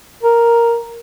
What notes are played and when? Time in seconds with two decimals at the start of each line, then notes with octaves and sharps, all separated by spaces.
0.23 A#4